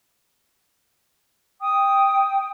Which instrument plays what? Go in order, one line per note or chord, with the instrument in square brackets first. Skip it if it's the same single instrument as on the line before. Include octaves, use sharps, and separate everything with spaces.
[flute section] G5 D#6